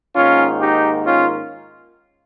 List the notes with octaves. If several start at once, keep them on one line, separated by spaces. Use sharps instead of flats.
G#2 D#3 A#3 C#4 F4
D#4 G4
C#4 F4